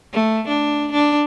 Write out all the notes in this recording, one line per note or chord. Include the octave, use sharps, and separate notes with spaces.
A3
D4
D4